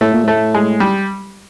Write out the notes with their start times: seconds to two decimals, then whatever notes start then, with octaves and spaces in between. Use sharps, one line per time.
0.01 A2 A3
0.13 A#2
0.24 A2 A3
0.54 G#3
0.80 G3